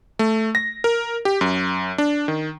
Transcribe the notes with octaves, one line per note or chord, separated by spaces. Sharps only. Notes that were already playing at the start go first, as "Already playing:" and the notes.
A3
A#6
A#4
G4
F#2
D4
D#3